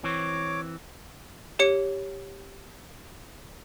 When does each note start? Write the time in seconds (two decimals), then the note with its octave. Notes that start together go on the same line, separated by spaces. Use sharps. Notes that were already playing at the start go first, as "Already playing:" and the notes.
0.04 E3 C4 C#5 D6
1.59 G4 C#5 C#7